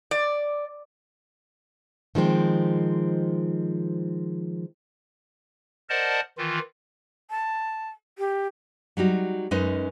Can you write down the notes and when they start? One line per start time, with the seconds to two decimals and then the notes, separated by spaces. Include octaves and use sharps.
0.11 D5
2.15 D#3 F3 G#3 C4
5.90 A#4 C5 D5 D#5 F#5 A5
6.38 D#3 E3 F4
7.30 A5
8.19 G4
8.97 F#3 G3 D#4 F#4
9.51 F#2 G#3 C#4 D#4 B4 D#5